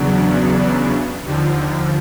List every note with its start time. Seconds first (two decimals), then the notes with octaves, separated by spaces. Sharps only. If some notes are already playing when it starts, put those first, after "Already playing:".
Already playing: E2 C#3 F#3 B3 D4
1.25 D#2 D3 F3